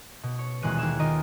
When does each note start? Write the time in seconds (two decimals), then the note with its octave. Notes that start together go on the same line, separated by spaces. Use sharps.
0.23 B2
0.39 C#5
0.63 D#1 B2 E3 G#3 F#6 D#7
0.78 D#2 E4 G#4 G#5 E7
0.99 D#3 F4 A#4 D#5 D#6